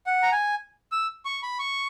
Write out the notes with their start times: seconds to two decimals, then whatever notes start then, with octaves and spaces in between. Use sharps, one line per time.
0.06 F#5
0.23 A#5
0.32 G#5
0.92 E6
1.25 C#6
1.43 B5
1.59 C#6